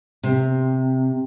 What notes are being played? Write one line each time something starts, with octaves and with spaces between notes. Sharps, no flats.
C3